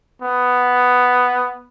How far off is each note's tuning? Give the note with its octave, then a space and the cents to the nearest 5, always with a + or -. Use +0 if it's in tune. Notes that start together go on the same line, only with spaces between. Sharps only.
B3 +5